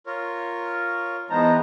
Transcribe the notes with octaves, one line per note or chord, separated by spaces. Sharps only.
F4 A#4 C#5
E3 G#3 B3 D#4 C5 A5 A#5